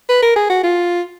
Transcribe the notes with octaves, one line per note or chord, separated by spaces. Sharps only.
B4
A#4
G#4
F#4
F4